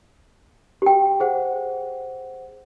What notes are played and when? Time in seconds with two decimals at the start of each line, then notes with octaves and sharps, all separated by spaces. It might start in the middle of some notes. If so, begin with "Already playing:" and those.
0.82 G4 G5
1.20 G#4 C5 F#5